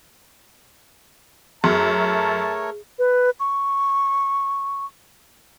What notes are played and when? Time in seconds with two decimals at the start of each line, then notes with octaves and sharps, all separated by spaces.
1.64 F#2 A3 G#4 A#4 C#5 A5
2.99 B4
3.40 C#6